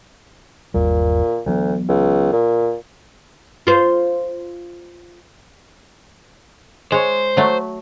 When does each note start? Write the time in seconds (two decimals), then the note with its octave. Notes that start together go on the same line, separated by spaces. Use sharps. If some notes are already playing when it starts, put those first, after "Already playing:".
0.74 G1 D#2 A#2 G3
1.46 D2 E3 F#3 B3
1.89 C#2
2.33 A#2
3.67 F4 C5
6.92 G#3 C5 C#5
7.37 F#3 A3